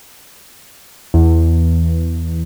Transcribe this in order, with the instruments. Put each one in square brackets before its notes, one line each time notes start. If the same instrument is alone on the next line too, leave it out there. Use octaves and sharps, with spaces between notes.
[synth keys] E2